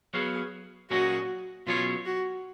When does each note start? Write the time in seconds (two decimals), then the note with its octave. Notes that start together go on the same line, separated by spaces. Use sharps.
0.14 F#3 B3 F#4 G#4 C#5 F5
0.90 A#2 F#3 C#4 F#4 G#4 D#5
1.67 B2 F#3 C#4 F4 G#4 C#5
2.05 F#4